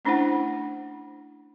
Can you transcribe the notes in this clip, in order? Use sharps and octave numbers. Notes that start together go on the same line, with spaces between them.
A3 C#4 D4 E4 C5 F#5